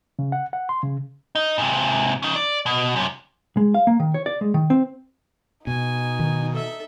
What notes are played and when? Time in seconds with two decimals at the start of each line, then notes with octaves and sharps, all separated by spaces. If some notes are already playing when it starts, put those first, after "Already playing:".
0.19 C#3
0.32 F#5
0.53 F#5
0.69 C6
0.83 C#3
1.35 D#4
1.58 G#2 C3
2.23 C#4 D#4
2.36 D5
2.66 B2
2.96 F#2 C3
3.57 G#3
3.74 F5
3.87 A#3
4.00 D#3
4.14 C#5
4.26 D5
4.41 G#3
4.54 D#3
4.70 C4
5.67 B2 D#4 G#5
6.19 D#3
6.54 A4 E5